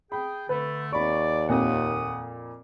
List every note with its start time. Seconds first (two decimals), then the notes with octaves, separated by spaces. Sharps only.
0.12 G#4 G5 B5
0.49 D3 A3 B4
0.93 D#2 D5 B5 C#6
1.49 F2 A#2 D#3 F#5 D#6